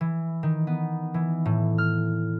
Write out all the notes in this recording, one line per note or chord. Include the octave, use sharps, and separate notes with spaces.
E3
D#3
B3
E3
A2
F6